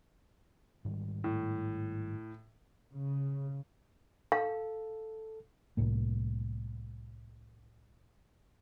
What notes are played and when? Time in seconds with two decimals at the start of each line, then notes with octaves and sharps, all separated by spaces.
0.85 G#2 D#3 G3
1.24 A2
2.94 C#3
4.32 A4 F5
5.77 C2 A2 A#3